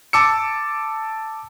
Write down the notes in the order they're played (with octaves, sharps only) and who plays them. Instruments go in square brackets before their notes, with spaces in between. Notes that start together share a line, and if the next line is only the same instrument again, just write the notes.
[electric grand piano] A5 D6 E6 C#7